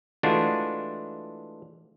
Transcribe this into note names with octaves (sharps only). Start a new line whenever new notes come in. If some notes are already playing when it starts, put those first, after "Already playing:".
E3 G#3 A3 D4 F4 F#4